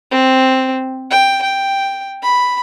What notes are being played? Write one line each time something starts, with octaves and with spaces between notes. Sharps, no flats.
C4
G5
G5
B5